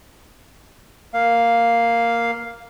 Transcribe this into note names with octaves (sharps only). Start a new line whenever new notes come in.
A#3 F5